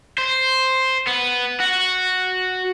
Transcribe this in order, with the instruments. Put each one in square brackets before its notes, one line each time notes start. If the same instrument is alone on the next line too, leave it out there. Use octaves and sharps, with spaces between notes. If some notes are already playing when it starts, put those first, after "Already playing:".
[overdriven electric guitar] C5
B3
F#4